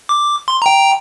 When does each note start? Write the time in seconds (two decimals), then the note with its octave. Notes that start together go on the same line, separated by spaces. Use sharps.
0.09 D6
0.48 C6
0.62 G5 A#5